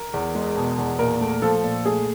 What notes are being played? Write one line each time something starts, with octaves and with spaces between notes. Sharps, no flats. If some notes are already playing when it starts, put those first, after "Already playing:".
Already playing: A#4
E2
G#3
B2
E2
A#2 A#4
A3
F3 A4
A#2
A3 G#4